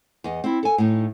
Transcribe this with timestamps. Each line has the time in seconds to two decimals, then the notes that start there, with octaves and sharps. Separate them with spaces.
0.24 E2 D#5
0.44 C4 E4
0.63 A4 G#5
0.78 A2 D#4